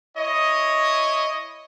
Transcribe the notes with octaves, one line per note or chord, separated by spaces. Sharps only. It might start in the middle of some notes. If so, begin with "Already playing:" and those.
E4 C#5 D#5